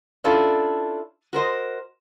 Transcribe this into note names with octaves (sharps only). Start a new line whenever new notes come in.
C#4 D4 E4 F4 A4
F#4 A#4 C5 D#5